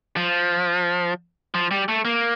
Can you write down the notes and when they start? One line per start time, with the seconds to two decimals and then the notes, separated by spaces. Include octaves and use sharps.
0.17 F3
1.54 F3
1.71 G3
1.89 A3
2.05 A#3